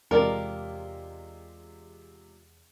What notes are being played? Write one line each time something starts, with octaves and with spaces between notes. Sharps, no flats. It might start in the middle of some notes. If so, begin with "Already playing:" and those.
E2 C3 G#3 F4 G4 A#4 D5